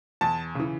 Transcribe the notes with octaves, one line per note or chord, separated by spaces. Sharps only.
E2 A5
C#3 E3